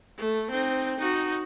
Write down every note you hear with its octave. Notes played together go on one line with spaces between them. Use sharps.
A3
C4 D#4
D#4 F#4